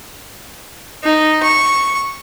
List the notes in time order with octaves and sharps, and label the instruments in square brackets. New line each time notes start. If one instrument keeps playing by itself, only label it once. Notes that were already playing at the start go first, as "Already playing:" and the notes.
[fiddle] D#4
C#6